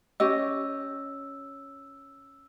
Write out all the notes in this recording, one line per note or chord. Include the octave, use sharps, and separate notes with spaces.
C#4 G4 D#5 E6